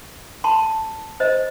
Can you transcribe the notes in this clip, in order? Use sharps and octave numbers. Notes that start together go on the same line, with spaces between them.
A5 C6
C5 D#5